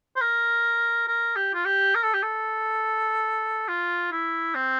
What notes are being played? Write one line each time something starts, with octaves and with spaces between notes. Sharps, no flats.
C5
A#4
A#4
G4
F4
G4
A#4
A4
G4
A4
F4
E4
C4